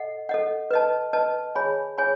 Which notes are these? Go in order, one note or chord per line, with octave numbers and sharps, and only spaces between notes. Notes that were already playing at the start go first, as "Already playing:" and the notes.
Already playing: A4 D#5 F#5
A4 D#5 F#5
B4 D#5 A5
B4 D#5 A5
G#4 C#5 G#5 B5
G#4 C#5 G#5 B5